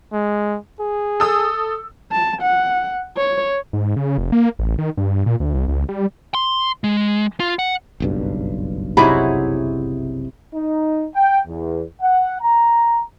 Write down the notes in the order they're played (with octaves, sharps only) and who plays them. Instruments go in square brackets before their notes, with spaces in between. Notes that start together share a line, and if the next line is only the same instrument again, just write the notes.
[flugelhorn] G#3
G#4
[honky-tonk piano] A4 D#6 E6
[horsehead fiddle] A5
F#5
C#5
[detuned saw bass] G#2
C#3
F1
A#3
A1
D#3
G2
A#2
D2
C2
C#2
G3
[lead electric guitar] C6
G#3
F4
F#5
[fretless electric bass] F#1 B1 G2
[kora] C3 D#4 [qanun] E4 F#4 G#4 [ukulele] C#5 E5 B5
[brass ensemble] D#4
G5
E2
F#5
A#5